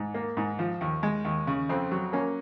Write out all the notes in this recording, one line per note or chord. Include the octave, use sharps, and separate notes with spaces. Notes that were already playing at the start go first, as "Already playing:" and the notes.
Already playing: G#2
A#3
G#2
F3
D#2
G#3
D#2
C#3
F2 C4
F#3
A#3 C#4